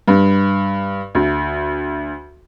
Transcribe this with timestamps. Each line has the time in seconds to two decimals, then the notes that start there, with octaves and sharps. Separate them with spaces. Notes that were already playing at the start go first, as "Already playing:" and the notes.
0.08 G2
1.15 D2